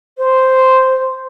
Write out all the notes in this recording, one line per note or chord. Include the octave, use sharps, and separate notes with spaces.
C5